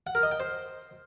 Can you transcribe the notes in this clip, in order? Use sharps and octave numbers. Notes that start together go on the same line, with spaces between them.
F#5
A#4
D#5
G5
C5